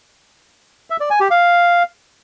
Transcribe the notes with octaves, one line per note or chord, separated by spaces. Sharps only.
E5
D5
G#5
G4
F5